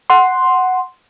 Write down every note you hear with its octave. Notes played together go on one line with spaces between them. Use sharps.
F#5 C6